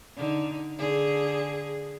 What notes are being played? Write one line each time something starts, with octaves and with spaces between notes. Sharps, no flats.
D3 D#4
D3 G#4